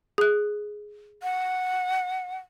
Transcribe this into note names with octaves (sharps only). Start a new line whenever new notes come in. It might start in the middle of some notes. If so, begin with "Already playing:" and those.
G#4 F#6
F#5